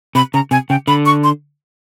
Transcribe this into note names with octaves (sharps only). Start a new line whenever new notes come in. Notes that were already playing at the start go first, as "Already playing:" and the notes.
C3 B5
C#3 A#5
C3 G#5
C#3 G5
D3 B5
C#6
C6